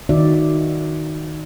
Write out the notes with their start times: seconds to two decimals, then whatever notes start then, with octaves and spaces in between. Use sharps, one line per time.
0.09 D#3 D#4 F#4 D5 E5